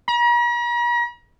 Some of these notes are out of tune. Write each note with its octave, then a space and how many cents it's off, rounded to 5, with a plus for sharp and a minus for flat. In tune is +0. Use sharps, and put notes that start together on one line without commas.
A#5 +45